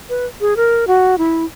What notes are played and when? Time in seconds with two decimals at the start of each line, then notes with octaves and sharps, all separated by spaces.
0.09 B4
0.41 G#4
0.57 A#4
0.87 F#4
1.18 E4